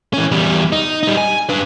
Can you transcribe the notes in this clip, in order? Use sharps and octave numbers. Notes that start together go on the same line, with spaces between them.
E3 C#4
E2 G3
D#4
G3 D#4
G#5
D4 B4